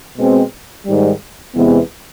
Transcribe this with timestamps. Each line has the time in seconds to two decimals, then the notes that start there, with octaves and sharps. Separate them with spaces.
0.17 B2 G#3 C4
0.86 G#2 D#3 G3
1.55 E2 C3 E3 G#3 B3